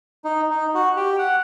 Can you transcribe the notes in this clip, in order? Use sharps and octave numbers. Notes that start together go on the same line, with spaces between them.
D#4
D#4
F#4
G4
F#5